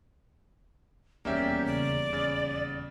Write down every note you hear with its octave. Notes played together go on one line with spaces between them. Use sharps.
D#1 E2 A#3 C#4 G4 D5 E5
C#3 D5
C#3 A6